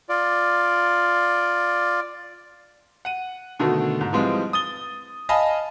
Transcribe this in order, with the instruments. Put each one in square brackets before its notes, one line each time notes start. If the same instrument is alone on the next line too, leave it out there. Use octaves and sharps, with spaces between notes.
[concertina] F4 D5
[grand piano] F#5 D#7
B2 D3 D#3 A3
G#2
E3 F3 G3 G#3 C4
D#6 A6 G7
D#5 F5 G#5 A5 B5